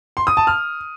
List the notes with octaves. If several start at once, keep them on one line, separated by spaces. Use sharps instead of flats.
C6
D#6
A5
F6